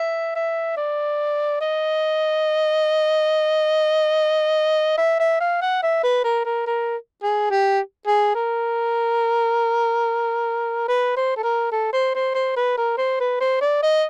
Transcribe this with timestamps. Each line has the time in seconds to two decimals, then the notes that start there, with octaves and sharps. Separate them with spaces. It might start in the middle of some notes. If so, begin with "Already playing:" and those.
Already playing: E5
0.36 E5
0.77 D5
1.61 D#5
4.98 E5
5.20 E5
5.41 F5
5.62 F#5
5.83 E5
6.03 B4
6.24 A#4
6.45 A#4
6.67 A#4
7.23 G#4
7.51 G4
8.07 G#4
8.35 A#4
10.88 B4
11.17 C5
11.37 A4
11.43 A#4
11.72 A4
11.93 C5
12.15 C5
12.35 C5
12.56 B4
12.78 A#4
12.98 C5
13.20 B4
13.41 C5
13.61 D5
13.83 D#5